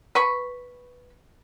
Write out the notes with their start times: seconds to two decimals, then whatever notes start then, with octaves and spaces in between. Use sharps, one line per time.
0.15 B4 B5 C#6